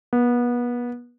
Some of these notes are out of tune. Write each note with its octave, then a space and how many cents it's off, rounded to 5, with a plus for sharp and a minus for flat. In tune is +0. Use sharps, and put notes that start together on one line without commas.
B3 -30